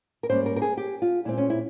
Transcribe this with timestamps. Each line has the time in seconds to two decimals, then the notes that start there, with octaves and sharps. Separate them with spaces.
0.23 A#4
0.29 G#2 G3 A#3 C#4 C5
0.46 A#4
0.56 A#4
0.62 G#4
0.77 G4
1.02 F4
1.25 A#2 G#3 C4 E4
1.38 C#4
1.50 E4